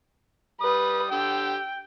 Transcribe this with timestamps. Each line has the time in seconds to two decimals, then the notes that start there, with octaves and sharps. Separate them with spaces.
0.61 G3 B4 D#6
1.11 D3 G4 G5 E6